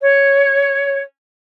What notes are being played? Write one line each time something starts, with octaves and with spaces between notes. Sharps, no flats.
C#5